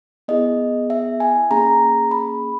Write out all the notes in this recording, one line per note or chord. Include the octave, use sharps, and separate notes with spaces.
B3 E4 G#4 D#5
E5
G#5
A#3 C#4 G#4 A#5
B5